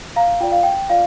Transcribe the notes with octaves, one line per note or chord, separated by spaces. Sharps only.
F5 A#5
F4 D5 G5
F5
G5
F4 D5 F5